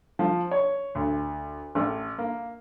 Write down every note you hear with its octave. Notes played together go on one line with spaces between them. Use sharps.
F3
C#5
D2
A1
A#3